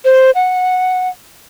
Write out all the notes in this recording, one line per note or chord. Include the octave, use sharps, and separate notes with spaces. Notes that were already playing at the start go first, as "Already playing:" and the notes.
C5
F#5